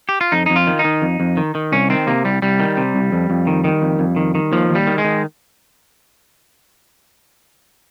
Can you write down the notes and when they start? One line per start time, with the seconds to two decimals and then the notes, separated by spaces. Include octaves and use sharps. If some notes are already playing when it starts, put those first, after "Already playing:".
0.09 G4
0.21 F4
0.32 F2 D#4
0.46 F2 D#4
0.56 F4
0.67 D#3
0.79 D#4
0.85 D#3
1.02 F2
1.20 F2
1.37 D#3
1.55 D#3
1.72 C2 C#4
1.90 D#3 C4
2.07 C3 A#3
2.25 C2 G3
2.42 C2 G3
2.60 D#3
2.77 C3
2.95 C2
3.12 F2
3.30 F2
3.47 D#3
3.64 D#3
3.82 F2
3.99 F2
4.16 D#3
4.35 D#3
4.52 D#2 F3
4.69 D#2
4.75 G3
4.87 D#3
4.98 G#3
5.04 D#3